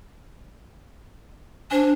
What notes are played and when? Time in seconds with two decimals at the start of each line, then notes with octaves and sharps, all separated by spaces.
1.71 D4 C5 G#5